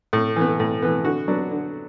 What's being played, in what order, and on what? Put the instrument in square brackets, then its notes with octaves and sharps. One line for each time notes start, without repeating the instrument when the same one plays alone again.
[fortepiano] A2
E3 B3
A2
E3 B3
D3 F#4
F#3 B3 D4
D3